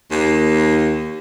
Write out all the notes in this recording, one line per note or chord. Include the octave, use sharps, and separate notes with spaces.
D#2